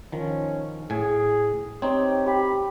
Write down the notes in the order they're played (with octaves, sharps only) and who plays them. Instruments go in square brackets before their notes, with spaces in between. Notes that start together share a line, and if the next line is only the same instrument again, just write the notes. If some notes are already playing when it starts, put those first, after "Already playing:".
[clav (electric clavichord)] D#3 F3 [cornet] C#4
[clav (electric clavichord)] A2 G#5 [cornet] G#4
[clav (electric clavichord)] C4 D#4 [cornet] G4 [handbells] C#5
[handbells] G4 G5 [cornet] B5